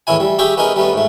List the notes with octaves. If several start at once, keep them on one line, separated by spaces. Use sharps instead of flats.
E2 A2 E3 C#4 E4 G#5
G3
G4 G#4 C#5 E5 G5
B3 C#4 D#4 G#4 A#4
G3 A3 B3 C#4
G#2 A3